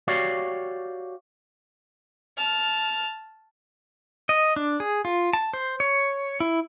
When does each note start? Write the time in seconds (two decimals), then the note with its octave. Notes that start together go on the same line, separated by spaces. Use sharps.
0.07 F#4 G4 C#5 D5 F5
2.37 A5 F6
4.29 D#5
4.56 D4
4.80 G#4
5.05 F4
5.33 A5
5.53 C5
5.80 C#5
6.40 E4